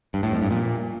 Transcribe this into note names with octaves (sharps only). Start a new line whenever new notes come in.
G2
A2
F2
G2
A#2